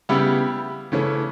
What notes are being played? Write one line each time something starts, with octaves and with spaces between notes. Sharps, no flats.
C#3 G3 B3 E4 G4
C#3 E3 A3 C#4